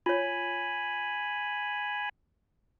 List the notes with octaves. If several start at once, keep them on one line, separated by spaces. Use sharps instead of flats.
F4 C#5 G#5 B5